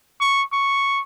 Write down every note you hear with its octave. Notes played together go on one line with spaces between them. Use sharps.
C#6
C#6